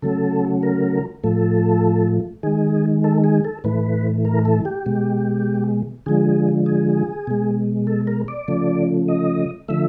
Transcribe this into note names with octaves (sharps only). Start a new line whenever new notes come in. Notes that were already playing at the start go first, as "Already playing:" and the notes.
C#3 F#3 A3 A4
A#4
A2 F3 A3 A4
D#3 G#3 G#4
A4
G#4
A4
A2 E3 A3 B4
A#4
A4
G4
B2 G#3
D3 F3 G#3 G#4
G#4
B2 G#3
A4
A#4
D5
C#3 F3 A3
D#5
D3 F3 A3 E5